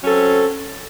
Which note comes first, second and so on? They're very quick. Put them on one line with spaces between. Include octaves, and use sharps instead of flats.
F#3 C#4 A4 C4